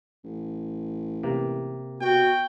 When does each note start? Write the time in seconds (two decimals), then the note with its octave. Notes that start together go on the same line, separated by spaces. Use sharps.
0.24 A1
1.23 C3 A#3
2.01 B2 F#4 G5